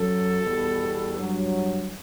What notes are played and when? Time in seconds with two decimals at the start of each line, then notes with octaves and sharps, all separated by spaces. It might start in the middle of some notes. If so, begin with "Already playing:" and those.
Already playing: F#2 F#3 A4
0.42 E2 B2 G3
1.16 G2 F#3